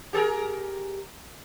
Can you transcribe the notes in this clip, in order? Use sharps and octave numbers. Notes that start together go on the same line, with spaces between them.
G4 G#4 A#4